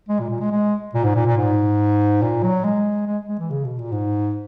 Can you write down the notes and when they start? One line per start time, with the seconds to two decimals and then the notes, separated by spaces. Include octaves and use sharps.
0.09 G#3
0.20 A#2
0.30 A#2
0.40 G#3
0.52 G#3
0.95 A#2
1.04 G#2
1.15 A#2
1.26 A#2
1.37 G#2
2.22 A#2
2.43 F#3
2.64 G#3
3.07 G#3
3.28 G#3
3.39 E3
3.50 C#3
3.64 B2
3.78 A#2
3.92 G#2